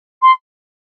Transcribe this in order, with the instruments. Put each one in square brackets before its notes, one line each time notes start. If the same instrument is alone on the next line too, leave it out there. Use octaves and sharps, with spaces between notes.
[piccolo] C6